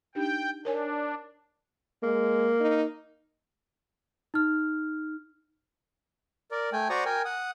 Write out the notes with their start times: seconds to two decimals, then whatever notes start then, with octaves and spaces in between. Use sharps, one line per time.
0.15 D4 D#4 G4 G5
0.65 D4 A#4 C#5 G#5
2.03 G#3 A#3
2.61 D#4
4.34 D#4 F6
6.51 A#4 D5
6.73 A3 G5 G#5
6.90 F#4 C5 D5 A#5 C#6 D#6
7.05 A#4 G5 G#5
7.25 F#5 D#6